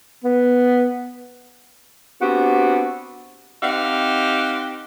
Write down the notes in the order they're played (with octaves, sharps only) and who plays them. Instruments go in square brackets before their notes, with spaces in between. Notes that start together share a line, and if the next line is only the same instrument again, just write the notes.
[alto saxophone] B3
[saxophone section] B3 C4 D4 F#4 G4
C4 D#4 G4 F5 F#5